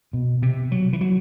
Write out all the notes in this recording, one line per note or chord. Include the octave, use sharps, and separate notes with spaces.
B2
C3
F#3
E3
F#3